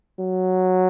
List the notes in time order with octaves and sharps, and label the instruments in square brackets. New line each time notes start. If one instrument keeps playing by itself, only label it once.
[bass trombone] F#3